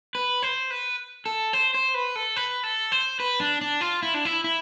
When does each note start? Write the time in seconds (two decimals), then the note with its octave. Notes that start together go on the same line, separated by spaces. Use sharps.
0.15 B4
0.43 C5
0.70 B4
1.26 A4
1.53 C5
1.74 C5
1.94 B4
2.16 A4
2.36 B4
2.63 A4
2.92 C5
3.20 B4
3.40 D4
3.61 D4
3.81 F4
4.03 E4
4.14 D4
4.25 E4
4.44 E4